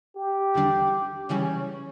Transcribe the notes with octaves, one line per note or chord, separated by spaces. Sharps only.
G4
E2 D3 G3 D4
C#3 E3 G3 C#4